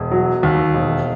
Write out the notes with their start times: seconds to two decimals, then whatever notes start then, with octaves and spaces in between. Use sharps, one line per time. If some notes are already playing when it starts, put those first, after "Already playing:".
Already playing: E1
0.11 F#3
0.43 D#2
0.74 E1